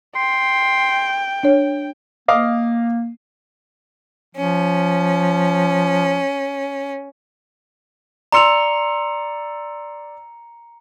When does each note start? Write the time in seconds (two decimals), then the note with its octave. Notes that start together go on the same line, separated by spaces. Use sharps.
0.16 G5 C6
1.43 D4 C#5
2.28 A#3 D#5 F5 D6
4.35 F3 C#4
8.32 D5 A#5 C6 E6 C#7 F7